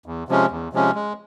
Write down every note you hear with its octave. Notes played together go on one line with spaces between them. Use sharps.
E2
C3 F3 G#3 C#4
E2
C3 F3 G#3 C#4
G#3